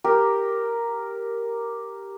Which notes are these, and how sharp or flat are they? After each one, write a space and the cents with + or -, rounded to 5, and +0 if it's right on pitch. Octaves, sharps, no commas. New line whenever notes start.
G4 +0 A#4 +0